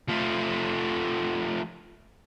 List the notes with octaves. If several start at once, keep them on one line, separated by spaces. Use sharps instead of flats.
F3 A3